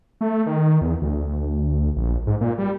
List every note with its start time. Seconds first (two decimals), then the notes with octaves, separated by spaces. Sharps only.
0.21 A3
0.46 D#3
0.81 E2
1.02 D2
1.96 A#1
2.27 G#2
2.41 A#2
2.58 G3